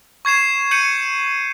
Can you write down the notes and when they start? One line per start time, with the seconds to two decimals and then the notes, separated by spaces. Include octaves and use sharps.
0.25 C#6 G#6 C7 E7
0.71 G6 C#7 D#7 F#7